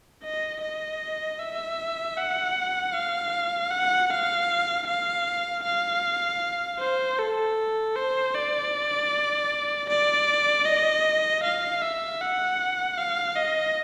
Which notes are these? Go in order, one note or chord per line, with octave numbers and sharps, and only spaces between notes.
D#5
D#5
E5
F#5
F5
F#5
F5
F5
F5
C5
A4
C5
D5
D5
D#5
F5
E5
F#5
F5
D#5